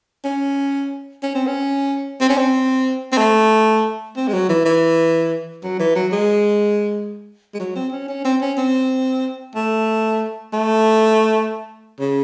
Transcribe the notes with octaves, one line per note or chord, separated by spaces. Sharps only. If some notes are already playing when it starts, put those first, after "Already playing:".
C#4
C#4
C4
C#4
C4
C#4
C4
C4
A3
C4
G#3
F#3
E3
E3
F#3
E3
F#3
G#3
G#3
F#3
C4
C#4
C#4
C4
C#4
C4
A3
A3
C#3